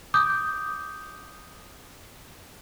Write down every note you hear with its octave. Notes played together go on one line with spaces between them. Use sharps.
D6 D#6 G6